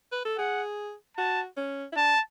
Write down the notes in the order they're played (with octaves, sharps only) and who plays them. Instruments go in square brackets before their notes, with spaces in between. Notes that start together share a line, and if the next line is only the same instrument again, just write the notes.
[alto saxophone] B4
A4
[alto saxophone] G#4 [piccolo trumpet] F#5
[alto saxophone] F#4 [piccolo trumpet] A5
[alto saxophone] C#4
E4
[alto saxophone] D4 [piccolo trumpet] A5